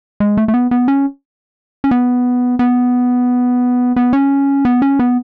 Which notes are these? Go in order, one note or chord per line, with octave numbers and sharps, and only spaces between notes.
G#3
A3
A3
B3
B3
C#4
C#4
B3
B3
B3
C#4
B3
C#4
B3